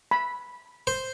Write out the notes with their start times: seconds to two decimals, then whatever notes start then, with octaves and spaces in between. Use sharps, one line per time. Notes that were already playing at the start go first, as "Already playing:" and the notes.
0.11 B5
0.87 C5